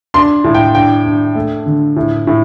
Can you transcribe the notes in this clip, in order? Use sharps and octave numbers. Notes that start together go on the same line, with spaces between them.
D4 C6
A2
G5
D4 G5
D4
A3
D3
A2
A2